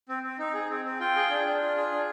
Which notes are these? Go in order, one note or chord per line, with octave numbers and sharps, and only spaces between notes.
C4
C4
D#4
G#4
C4
C4
F4 G5
G#4
D4
D4
F4
G#4
D4